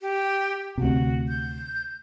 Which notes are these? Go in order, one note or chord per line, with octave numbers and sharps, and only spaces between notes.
G4
D2 C3 F#4
G6